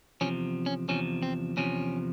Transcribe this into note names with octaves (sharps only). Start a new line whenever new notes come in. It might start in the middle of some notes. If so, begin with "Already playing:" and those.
E2 C3 F3 C#4
C#4
E2 C3 F3 C#4
C4
E2 C3 F3 C#4